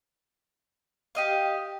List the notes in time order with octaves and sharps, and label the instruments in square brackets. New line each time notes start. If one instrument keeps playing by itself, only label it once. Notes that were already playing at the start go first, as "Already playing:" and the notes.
[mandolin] G4 D#5 F5